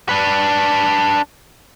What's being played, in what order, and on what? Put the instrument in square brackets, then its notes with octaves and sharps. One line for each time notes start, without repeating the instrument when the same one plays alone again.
[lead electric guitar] D4 B4